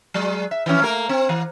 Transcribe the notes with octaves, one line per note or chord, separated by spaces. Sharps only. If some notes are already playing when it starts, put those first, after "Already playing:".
F#3 G#3
E5
E3 F3 C#4
A3 A#3 A#4
C4
E3